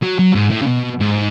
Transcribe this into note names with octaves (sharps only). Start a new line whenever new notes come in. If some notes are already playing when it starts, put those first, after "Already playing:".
F#3
F#3
G#2
A2
C#3
B2
G#2